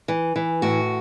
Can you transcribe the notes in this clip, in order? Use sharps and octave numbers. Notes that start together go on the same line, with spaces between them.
E3
E3
A2 F#4